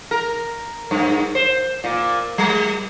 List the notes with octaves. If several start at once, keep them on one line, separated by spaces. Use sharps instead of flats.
A#4
G2
C5
A#2
G3